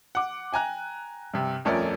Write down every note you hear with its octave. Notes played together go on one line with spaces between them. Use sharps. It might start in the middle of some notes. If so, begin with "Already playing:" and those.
F#5 D6
G5 G#5 A#5 F#6
G2 C3
D#1 F2 A3 C#4 A#4 D5